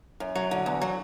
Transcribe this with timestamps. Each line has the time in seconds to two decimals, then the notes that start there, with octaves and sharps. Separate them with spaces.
0.20 F#2
0.35 F#3
0.51 D3
0.66 E2
0.82 F#3